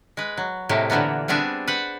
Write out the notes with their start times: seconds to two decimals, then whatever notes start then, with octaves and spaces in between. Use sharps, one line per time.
0.17 G#3 B4
0.37 F#3
0.69 A2 C3 G#3 A#3 G4
0.90 A#2 D3 E3 A#3 B3
1.28 G3 B3 C4 D4 G#4
1.68 B4 C5 F#5